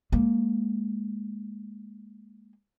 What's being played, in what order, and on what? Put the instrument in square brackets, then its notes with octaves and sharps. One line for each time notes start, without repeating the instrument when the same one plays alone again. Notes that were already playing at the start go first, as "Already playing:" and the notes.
[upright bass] G#3 A#3